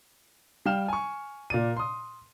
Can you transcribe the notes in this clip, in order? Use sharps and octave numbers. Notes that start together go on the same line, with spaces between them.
G3 F5 G5 F6 E7
G#5 C#6
A#2 D5 D#7
C6 D#6